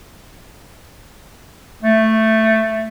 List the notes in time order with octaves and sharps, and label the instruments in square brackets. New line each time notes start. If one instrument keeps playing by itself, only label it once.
[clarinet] A3